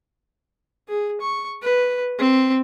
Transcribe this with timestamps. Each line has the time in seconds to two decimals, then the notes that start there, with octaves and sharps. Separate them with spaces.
0.89 G#4
1.21 C#6
1.63 B4
2.19 C4